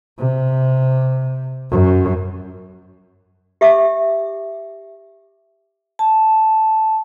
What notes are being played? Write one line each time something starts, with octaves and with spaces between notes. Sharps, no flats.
C3
F#2
G4 E5 D6
A5